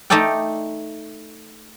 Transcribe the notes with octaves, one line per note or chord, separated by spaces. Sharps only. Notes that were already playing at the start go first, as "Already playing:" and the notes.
A3 D#4 A4 D5 G5